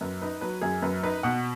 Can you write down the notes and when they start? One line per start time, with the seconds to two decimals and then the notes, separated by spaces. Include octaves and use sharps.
0.01 F#2 B4
0.22 D#4 B4
0.41 F#3 B4
0.61 F#2 G#4
0.82 F#2 B4
1.03 D#4 B4
1.23 B2 F#5